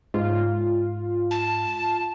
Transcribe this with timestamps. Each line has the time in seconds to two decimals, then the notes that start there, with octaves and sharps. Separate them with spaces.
0.14 G#2 F4
1.31 A5